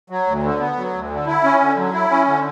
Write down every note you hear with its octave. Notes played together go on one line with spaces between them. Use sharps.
F#3
D2
D3
B3
F#3
D2
D3
E4
C#4
D3
F#3
E4
C#4
D3